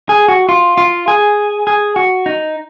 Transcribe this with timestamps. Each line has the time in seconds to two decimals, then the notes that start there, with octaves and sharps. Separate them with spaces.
0.09 G#4
0.28 F#4
0.49 F4
0.78 F4
1.08 G#4
1.67 G#4
1.96 F#4
2.26 D#4